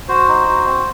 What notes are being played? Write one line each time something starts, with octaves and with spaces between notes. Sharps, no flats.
F#4 C5
D#4
F#4
C4